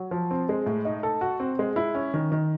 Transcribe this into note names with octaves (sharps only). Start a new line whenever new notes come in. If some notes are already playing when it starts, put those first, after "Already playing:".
Already playing: F#3
F3
C4
G#3
A2
D#4
A4
F#4
C4
G#3
E4
C#4
D#3
D#3